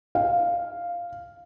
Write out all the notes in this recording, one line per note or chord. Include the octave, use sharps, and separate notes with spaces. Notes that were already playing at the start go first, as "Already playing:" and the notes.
F5